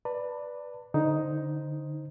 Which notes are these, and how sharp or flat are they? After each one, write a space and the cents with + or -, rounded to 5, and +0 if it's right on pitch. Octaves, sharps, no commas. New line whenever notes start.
B4 +0 D5 +0 A5 +35
D3 +0 D#4 +5 C5 -5